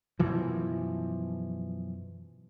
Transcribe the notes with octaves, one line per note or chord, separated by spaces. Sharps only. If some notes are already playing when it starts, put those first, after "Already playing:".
F#2 B2 E3 F3